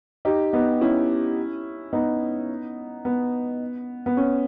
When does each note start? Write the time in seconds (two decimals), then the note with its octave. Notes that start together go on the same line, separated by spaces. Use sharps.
0.25 D#4 G4
0.53 B3 D#4
0.81 C#4 E4
1.93 B3 D#4
3.05 B3
4.06 B3
4.17 C#4